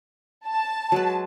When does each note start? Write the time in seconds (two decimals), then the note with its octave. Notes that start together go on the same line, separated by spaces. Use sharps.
0.48 A5
0.92 F#3 G#3 B4